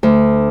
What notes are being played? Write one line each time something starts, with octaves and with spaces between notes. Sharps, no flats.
D2